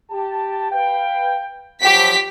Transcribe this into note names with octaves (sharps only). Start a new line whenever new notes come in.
G4 A5
B4 F5 G5
F3 F#3 G4 B6